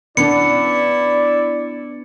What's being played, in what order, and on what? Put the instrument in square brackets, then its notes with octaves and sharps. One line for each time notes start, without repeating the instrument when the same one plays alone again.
[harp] B3 D4 [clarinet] E4 [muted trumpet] D5 [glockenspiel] C#7